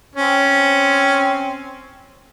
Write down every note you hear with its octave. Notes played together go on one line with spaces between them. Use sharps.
C4 C#4